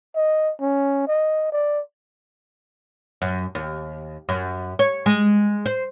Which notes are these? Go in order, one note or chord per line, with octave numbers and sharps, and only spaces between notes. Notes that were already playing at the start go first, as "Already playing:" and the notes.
D#5
C#4
D#5
D5
F#2
D#2
F#2
C#5
G#3
C5